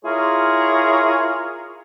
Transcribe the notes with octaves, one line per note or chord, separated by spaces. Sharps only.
E4 F4 G#4 A#4 C#5